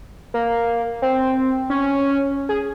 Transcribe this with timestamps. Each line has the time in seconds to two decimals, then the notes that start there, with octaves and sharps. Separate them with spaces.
0.34 A#3
1.02 C4
1.70 C#4
2.49 G#4